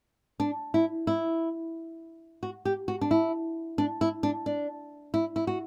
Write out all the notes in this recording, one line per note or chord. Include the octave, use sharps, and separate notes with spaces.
D4
E4
E4
F#4
G4
F#4
D4
E4
D4
E4
D4
D4
E4
E4
F#4